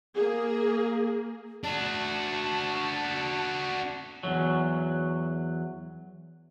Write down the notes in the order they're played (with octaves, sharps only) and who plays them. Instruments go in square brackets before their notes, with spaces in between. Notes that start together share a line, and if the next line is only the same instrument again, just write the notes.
[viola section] A#3 G#4
[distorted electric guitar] D4 F#4 [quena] A5
[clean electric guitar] E2 G2 F#3